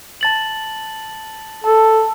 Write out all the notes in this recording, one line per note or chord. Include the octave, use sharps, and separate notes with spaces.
A5 A6 F#7
A4 A5